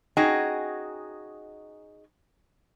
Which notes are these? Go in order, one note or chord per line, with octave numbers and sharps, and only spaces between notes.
C#4 D#4 F#4 G#4 D#5 G5